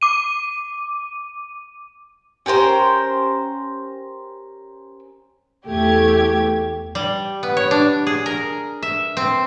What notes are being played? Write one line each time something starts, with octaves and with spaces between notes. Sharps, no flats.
D6 D#7
C#4 G4 A#4 C5
E2 A3 G4 G#6
G3
B3
C#5
D4
G#4
A#4
E5
C4